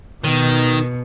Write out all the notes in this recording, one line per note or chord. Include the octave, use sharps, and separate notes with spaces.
B2 D#3